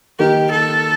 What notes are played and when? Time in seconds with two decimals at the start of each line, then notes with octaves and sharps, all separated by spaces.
0.19 D#3 A#3 D#4 G4 A#4
0.51 A4